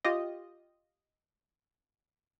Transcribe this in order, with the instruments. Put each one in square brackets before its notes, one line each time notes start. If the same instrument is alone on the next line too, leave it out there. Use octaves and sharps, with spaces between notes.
[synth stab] F4 G4 D#5